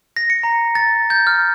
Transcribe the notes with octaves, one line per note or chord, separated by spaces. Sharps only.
A#6
C#7
A#5
A6
G6
F6